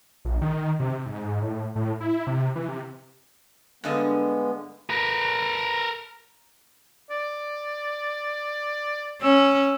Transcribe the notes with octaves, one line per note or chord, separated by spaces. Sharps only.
A#1
D#3
C3
G#2
A2
A2
E4
C3
E3
C3
G2 D3 G#3 B3 D#5
A#4 B4
D5
C#4 E6